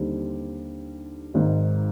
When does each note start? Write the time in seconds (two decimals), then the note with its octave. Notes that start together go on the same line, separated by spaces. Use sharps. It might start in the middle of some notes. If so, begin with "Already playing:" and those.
Already playing: D#2 D3 G3 C4 D#4
1.34 G#1 G#2 D#3